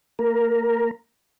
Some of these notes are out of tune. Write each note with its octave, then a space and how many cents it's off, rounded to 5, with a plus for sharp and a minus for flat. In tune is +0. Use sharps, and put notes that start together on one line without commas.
A#3 -35 A#4 +5